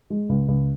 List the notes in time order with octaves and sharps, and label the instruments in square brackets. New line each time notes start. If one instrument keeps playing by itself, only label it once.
[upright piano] G#3
C#2
C#2